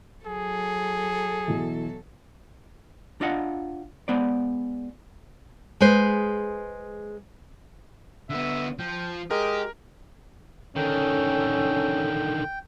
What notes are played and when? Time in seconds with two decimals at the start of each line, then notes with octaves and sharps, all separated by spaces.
0.26 F#3 G#4 A4
1.48 B2 E3
3.21 D4 F4 D#5 F5 F#5
4.08 G#3 B3 C5 D5
5.80 G#3 G#4 B4 C5
8.30 D3 B3 E5
8.80 F3 G5
9.31 G#3 G4 A#4 D#6
10.76 D3 D#3 C#4 A4 G5